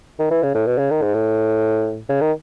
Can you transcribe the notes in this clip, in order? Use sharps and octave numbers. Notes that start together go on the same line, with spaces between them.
D#3
E3
C#3
A2
B2
C#3
D#3
G#2
A2
C#3
D#3